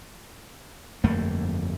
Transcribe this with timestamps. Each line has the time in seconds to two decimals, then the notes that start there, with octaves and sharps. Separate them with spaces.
1.04 G1 F2 A3 A#3